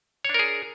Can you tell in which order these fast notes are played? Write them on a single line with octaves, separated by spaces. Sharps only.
C#5 D4 A#4 G#4